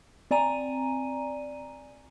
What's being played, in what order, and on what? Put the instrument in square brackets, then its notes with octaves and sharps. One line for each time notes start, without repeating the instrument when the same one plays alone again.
[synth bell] C4 D5 G#5 A#5 D#7